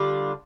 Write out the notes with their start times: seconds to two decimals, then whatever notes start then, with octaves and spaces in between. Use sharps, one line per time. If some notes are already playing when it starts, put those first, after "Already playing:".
Already playing: D3 G3 D4 F4